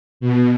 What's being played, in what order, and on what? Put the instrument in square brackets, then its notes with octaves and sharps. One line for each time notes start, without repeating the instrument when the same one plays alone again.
[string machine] B2